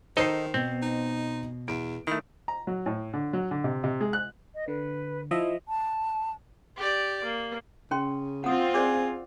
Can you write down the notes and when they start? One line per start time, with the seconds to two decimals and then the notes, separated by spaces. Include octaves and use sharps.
0.17 D#3 D#4 A4 C5 D#5 C7
0.54 B2 C4
0.82 D#4
1.68 E2 D7
2.07 D#3 A3 E4
2.48 A#5
2.67 F#3
2.86 A2
3.13 D3
3.33 F#3
3.51 D3
3.64 C3
3.84 C3
4.01 G#3
4.13 F#6
4.55 D#5
4.68 D3 B4
5.31 F3 E4 D#5 E5
5.68 A5
6.76 G4 D5
7.24 A#3
7.91 C#3 C#4 G5 C6
8.44 C4 F4 F#5 D#6
8.74 G#4 C5 D5 D6